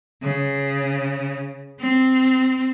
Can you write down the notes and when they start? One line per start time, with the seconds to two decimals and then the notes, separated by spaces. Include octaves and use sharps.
0.22 C#3
1.80 C4